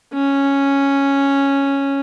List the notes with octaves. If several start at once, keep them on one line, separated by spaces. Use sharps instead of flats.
C#4